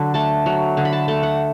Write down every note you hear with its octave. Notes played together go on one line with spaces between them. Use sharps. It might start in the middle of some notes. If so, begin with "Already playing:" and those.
Already playing: D3 F#3 B5
A3 A5
F#3
D3
B5
A5
A3 A5
F#5